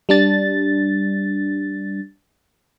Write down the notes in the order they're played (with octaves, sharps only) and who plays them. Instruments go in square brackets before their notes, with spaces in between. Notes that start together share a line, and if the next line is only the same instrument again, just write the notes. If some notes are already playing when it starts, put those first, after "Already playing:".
[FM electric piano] G3 D4 A6